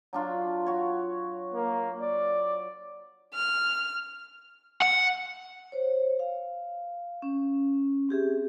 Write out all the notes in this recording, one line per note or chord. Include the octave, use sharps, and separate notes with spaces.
F#3 D4 F4
F#4 C#5
A#3
D5
F6
F#5
C5 C#5
F5
C#4
C4 G4 G#4 E5